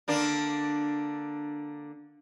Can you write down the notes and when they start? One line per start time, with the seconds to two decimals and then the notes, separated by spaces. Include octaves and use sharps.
0.08 D3 A#3 D4